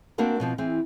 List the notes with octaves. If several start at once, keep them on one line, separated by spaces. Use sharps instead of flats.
A#3 C4 D4 F#4 A#4 B4
B2 F3 C4
E3 C4 G#4